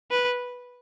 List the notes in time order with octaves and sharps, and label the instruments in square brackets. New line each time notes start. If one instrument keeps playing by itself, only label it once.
[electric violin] B4